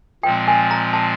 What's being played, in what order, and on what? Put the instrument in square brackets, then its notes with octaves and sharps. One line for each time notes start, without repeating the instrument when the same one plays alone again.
[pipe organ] A#2 F3 G#3 C4 [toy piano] G5
[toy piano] G#5
A#5
A5